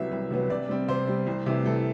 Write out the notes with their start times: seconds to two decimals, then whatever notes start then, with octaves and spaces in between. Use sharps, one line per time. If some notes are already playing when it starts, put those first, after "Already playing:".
Already playing: C2 C3 F#3 B3 E5
0.11 C2
0.30 C3 F#3 B3
0.50 C3 D5
0.69 G3 C4
0.88 C3 C5
1.08 G3 C4
1.27 C2
1.46 C3 E3 A3
1.65 C2 A4